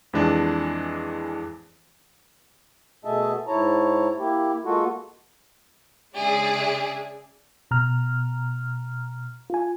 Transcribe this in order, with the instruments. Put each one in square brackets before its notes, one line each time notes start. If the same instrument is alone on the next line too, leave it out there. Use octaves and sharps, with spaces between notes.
[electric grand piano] F2 E3 G#3 D4
[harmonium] B2 A3 G#4 D#5 E5 A5
G#2 E4 C#5 A5 A#5
A#3 E4 G4
G#3 A#3 F4 F#4 A4
[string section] C#3 G#3 D4 G#4 D5 E5
[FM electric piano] B2 A#5 F6
F4 G#5